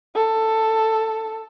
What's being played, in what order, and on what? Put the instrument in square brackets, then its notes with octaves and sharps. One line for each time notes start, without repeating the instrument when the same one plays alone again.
[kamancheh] A4